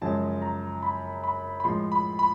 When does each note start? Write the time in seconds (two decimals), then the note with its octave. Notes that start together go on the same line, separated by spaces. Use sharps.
0.01 F#2 C#3 F3 G#3 A5
0.42 A#5
0.83 B5
1.24 B5
1.60 B5
1.64 A2 F3 G#3 C6
1.92 B5
2.19 B5